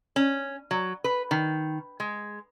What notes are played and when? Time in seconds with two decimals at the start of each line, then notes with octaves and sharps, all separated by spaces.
0.16 C#4
0.71 F#3
1.04 B4
1.31 D#3
2.00 G#3